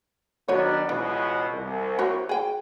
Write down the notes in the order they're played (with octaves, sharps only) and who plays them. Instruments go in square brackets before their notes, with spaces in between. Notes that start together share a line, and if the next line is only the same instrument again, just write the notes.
[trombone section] D#3 B3 D4 [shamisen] F#3 C5 C#5
[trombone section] C#2 B2 [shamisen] E3
[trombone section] C2
[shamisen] F#4 A#4 C#5
G#4 G5